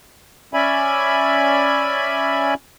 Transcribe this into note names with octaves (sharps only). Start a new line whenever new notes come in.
C#4 D5 E5 G#5 B5